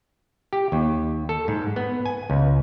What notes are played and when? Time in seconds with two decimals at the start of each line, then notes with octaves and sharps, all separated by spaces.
0.53 G4
0.72 D#2
1.29 A4
1.48 G#2
1.76 B3
2.06 G#5
2.30 C#2